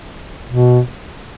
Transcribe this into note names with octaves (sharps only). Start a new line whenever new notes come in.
B2